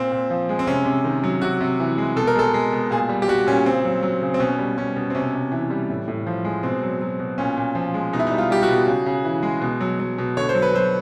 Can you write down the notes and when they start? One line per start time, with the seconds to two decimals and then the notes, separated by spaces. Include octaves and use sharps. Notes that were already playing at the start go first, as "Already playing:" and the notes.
Already playing: A#2 C4
0.12 A#2
0.30 F3
0.49 G#3
0.59 C4
0.67 C3 C#4
0.86 C3
1.04 D#3
1.23 F#3
1.42 C3 F#4
1.60 C3
1.80 E3
1.98 G#3
2.16 B2 A4
2.27 A#4
2.35 G#3 A4
2.54 G#3
2.73 B2
2.91 A#2 G#4
3.09 G3
3.22 G4
3.28 G3 F#4
3.47 A#2 C#4
3.66 C#3 C4
3.85 F#3
4.03 F#3
4.22 C#3
4.34 C4
4.40 B2 C#4
4.59 G3
4.77 G3 C#4
4.96 B2
5.10 C4
5.15 C3 C#4
5.34 C3
5.52 E3
5.70 G3
5.89 A2
6.08 A2
6.27 F3
6.45 G#3
6.63 B2 C4
6.83 F#3
7.01 F#3
7.19 B2
7.38 A#2 C#4
7.57 A#2
7.75 F3
7.94 G#3
8.13 B2 D#4
8.20 E4
8.27 D#4
8.32 G3
8.38 F4
8.50 G3 G4
8.63 F#4
8.68 B2
8.87 C#3
9.06 C#3
9.25 E3
9.43 G#3
9.61 B2
9.81 F#3
10.00 F#3
10.18 B2
10.37 D3 C#5
10.49 C5
10.55 F#3
10.62 B4
10.74 F#3 C5